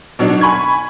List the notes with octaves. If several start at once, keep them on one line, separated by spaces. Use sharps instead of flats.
B2 F#3 D4 D#4
G#5 B5 C#6 G#6